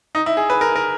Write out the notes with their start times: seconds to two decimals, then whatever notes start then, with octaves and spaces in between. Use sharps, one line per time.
0.15 D#4
0.26 E4
0.37 G#4
0.50 B4
0.61 A#4
0.76 A#4